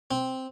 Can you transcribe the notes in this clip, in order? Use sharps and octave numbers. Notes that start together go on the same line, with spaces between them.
C4